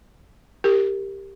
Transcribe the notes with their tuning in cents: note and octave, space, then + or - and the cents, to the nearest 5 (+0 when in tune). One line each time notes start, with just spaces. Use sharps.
G4 +5 A#4 -15